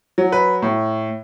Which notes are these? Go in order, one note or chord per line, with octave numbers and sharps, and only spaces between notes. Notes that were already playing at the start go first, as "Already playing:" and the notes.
F#3
B4
A2